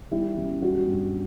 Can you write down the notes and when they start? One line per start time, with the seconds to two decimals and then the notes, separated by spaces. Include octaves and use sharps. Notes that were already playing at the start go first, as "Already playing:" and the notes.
0.11 G3 E4
0.37 F#2
0.62 G3 F#4
0.87 G2